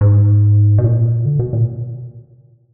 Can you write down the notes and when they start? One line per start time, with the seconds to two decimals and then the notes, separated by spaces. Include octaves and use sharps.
0.01 G#2
0.78 B2
0.84 A#2
1.25 D3
1.39 B2
1.53 A#2